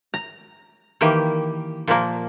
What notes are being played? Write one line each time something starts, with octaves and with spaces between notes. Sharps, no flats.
A#5
D#3 E3 A#3 G4
A#2 F3 A#3